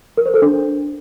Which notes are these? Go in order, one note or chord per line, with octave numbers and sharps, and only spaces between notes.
A#4
C5
A4
D4